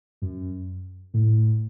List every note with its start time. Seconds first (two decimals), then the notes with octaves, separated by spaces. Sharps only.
0.22 F#2
1.14 A2